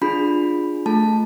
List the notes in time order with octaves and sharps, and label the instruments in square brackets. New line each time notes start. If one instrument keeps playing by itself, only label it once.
[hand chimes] D4 F4 G#4 B5
A3 F4 A4 A5